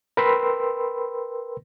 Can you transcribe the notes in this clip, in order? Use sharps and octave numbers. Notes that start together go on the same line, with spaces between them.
A#4 B4 G5 B5 C6 E6